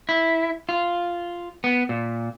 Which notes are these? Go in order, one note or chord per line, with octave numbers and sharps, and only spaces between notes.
E4
F4
B3
A#2